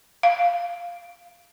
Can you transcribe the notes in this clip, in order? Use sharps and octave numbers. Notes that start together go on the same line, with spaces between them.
F5